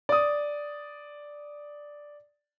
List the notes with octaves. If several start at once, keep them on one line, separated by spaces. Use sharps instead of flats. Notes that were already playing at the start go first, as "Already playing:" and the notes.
D5 D#6